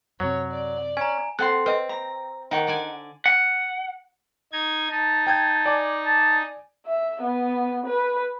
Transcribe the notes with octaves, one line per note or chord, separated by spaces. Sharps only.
F#2 C3 F#3 C#5
D5
C#4 G#5 A#5
C4 A4 F#5 C6 F#6
C4 B4 D#5
A#5
D#3 D#4 F#5 C#6
D3 D5 G#5
F#5
D#4 G#6
D#4 A5
G5 A5 G6 G#6
D5 G#5 D6
A5
E5
B3
B4